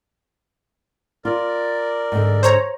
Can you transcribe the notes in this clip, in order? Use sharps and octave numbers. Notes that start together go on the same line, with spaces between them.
F4 A#4 D5
G#2 D3
C5 C#5 A#5